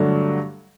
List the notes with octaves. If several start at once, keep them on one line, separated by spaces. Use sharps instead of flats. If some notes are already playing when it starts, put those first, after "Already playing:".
Already playing: G2 D3 F#3 A3 D4